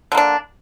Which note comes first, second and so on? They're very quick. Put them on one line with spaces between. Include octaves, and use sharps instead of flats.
D3 A#3 D4